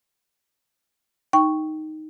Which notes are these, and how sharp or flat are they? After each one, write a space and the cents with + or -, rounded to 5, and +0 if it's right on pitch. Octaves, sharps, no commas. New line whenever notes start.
D#4 +0 G5 +0 C#6 +0